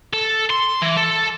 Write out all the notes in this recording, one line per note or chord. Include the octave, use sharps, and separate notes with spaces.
A4
C6
E3
A4